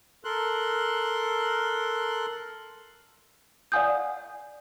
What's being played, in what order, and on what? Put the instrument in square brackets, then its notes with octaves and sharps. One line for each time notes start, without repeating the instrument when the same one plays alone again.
[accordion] A4 A#4 C6 F#6
[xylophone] D5 F5 F#5 G#5 D#6 G6